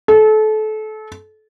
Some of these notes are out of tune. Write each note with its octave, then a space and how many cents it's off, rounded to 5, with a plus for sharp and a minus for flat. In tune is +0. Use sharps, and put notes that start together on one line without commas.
A4 -30